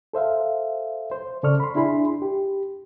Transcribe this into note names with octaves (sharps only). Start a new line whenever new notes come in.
A4 C5 E5 F5
C5
C#3 A4 D5 C#6 F6
B5 C6
D4 E4 G#4 B5 C6
G4